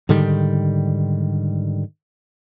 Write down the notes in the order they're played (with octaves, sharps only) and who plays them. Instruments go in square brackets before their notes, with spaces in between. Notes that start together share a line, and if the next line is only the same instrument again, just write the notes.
[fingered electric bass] G#2 D3 D#3 G3